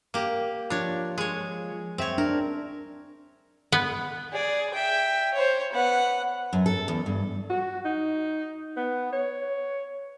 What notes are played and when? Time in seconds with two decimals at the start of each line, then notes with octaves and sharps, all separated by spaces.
0.14 A#3 G4
0.70 F3 D4 F4 C#5 A#5
1.18 G#3 C#5
1.98 F#2 C4 C#5 E5 G5
2.18 D4 A#4
3.72 B3
4.32 G#4 D5
4.74 E5 G5
5.34 C5 C#5
5.73 B3 F#5
6.53 F#2
6.66 A4
6.88 E2
7.06 G2
7.50 F#4
7.85 D#4
8.77 B3
9.13 C#5